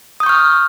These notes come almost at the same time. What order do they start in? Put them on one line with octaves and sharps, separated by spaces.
D#6 G6 C#6 F6